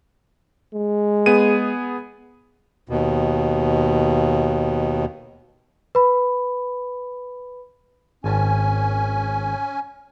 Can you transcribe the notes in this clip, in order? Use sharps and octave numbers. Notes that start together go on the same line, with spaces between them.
G#3
B3 G#4 D#7
D#2 B2
B4 B5
G#1 C#4 G#5 A5